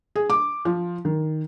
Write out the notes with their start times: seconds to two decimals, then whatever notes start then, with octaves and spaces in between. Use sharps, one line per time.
0.16 G#4
0.30 D6
0.65 F3
1.05 D#3